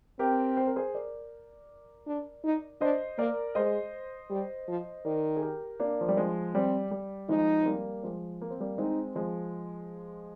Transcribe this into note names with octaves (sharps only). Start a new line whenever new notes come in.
C4 G4 A#4
C5
A#4
G#4 C5
A#4 D5
D4
D#4
D4 C5 D#5
A#3 A#4 D5
G#3 C5 D#5
G3
F3
D#3 A#4 D5
G#4
G4 A#4
A#3 D4
F3
G3
F3 G#3
G3 C4
G3
F3 G#3 D#4
C4
G3 A#3
F3 G#3
A#3
C4
G3 A#3
G#3 C4 D#4
F3 G#3